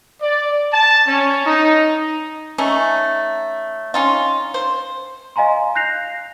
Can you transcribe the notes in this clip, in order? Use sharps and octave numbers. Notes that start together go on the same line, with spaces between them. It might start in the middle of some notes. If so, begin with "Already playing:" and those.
D5
A5
C#4
D#4
A3 C#4 D#4
C#4 D#4 F4
C5
D#5 F5 G#5 A#5 C6
F#6 G6 A#6 C7 F7